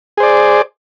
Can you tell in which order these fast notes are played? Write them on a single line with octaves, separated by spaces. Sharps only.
G#4 C5 D5